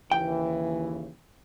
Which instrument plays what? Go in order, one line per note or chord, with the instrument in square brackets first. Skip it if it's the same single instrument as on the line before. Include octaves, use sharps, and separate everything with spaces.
[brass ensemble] D#2 C#3 E3 [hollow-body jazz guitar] G5